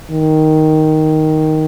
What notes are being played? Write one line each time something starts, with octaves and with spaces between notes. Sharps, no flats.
D#3